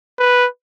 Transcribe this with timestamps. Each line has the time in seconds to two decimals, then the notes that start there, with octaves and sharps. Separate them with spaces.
0.19 B4